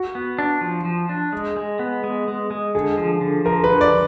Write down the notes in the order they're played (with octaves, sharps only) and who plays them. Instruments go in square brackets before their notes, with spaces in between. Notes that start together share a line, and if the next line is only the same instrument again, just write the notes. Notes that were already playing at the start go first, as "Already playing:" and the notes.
Already playing: [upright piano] F#4
[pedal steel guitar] B3
D4
F3
F3
D4
G#3
G#3
B3
G#3
G#3
G#3
[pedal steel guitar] D3 [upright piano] G#4
[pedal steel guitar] F3
D3
[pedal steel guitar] F3 [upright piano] A#4
[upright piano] B4
[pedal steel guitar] D3
[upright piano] D5